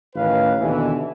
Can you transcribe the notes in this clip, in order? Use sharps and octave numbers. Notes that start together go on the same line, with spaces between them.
A1 D#3 C#4 B4 F5
D#2 B2 D3 E3